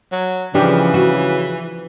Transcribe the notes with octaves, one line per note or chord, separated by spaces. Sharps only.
F#3
C#3 E3 F3 D4 G4
F#4